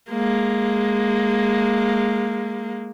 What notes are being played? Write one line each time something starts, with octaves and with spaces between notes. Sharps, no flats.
G#3 A#3